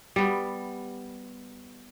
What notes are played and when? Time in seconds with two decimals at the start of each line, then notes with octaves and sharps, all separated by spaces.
0.16 G3 B3